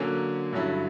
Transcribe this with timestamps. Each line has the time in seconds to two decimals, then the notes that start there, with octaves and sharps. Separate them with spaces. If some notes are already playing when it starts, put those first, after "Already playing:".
Already playing: D3 F#3 A#3 C#4
0.53 G2 D3 F#3 C#4 E4